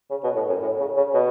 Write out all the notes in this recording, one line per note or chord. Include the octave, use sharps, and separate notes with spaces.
C#3
B2
A2
F#2
A2
C#3
C#3
B2